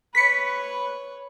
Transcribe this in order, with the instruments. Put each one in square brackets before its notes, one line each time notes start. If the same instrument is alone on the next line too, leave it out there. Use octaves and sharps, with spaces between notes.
[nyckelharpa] B4 C#5 [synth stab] B6 C#7